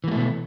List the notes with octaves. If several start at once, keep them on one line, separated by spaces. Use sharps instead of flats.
B2 E3 A3 A#3